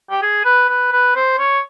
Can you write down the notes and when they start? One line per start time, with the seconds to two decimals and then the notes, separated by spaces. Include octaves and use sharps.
0.11 G4
0.22 G#4
0.45 B4
0.69 B4
0.92 B4
1.16 C5
1.39 C#5